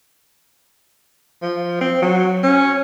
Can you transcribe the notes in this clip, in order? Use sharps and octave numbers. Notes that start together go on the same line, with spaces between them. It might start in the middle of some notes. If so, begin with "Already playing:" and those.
F3
C4
F#3
C#4